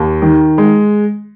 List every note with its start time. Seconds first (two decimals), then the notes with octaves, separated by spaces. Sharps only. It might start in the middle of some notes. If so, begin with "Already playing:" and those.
Already playing: D#2
0.22 D#3
0.58 G#3